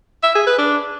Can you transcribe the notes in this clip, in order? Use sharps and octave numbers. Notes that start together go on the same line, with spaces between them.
E5
G#4
B4
D4